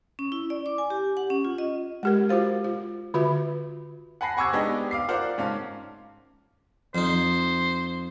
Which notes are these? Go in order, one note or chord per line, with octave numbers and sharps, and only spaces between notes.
C#4
E4
D5
D6
G#5
G4
F#5
C#4
F4
D#5
G#3 G4 A#4
F4 F#4 C5 F5
F4
D3 F4 F#4 B4 E5
F#5 G#5 A5 B5 A#6 C7
F#5 G#5 C#6 D6 E6 G#6
G#3 B3 D4 D#4 G4 D#5
F5 D6 C7
F4 A#4 C5 D5 F5 F#5
G#2 C#4 F5 A5
F2 D#4 C5